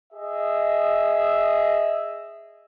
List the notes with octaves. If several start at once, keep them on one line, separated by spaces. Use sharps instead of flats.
G#4 D#5 E5